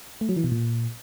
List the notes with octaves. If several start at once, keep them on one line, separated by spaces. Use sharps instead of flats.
A3
F#3
E3
B2
A#2